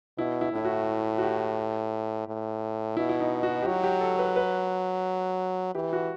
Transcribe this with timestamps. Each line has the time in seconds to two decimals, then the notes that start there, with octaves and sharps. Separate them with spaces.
0.18 B2 E4
0.41 E4
0.53 A2 E4
0.65 F#4
1.18 F#4
1.23 G4
2.27 A2
2.97 B2 E4
3.09 E4
3.20 D#4
3.43 F#4
3.62 G4
3.66 F#3 F#4
3.84 G4
4.01 A4
4.19 B4
4.36 B4
5.74 E3 G4
5.93 F#4